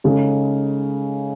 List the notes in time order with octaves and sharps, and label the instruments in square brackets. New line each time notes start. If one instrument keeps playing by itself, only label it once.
[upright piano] C#3 G#3 D#4 A4